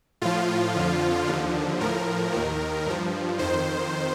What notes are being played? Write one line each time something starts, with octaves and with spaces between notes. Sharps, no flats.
A2 F3 F4
F2 D3 F3
D#2 D3 F3
A2 F3 A#4
D#2 D#3
G2 F3
F2 D#3 C5